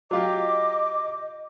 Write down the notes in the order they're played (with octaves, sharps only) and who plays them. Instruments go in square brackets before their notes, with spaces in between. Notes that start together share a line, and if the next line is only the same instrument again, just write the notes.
[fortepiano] F#3 F4 G4 [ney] D#5 [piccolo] D6